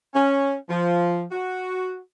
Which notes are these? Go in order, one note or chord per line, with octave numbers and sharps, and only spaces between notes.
C#4
F3
F#4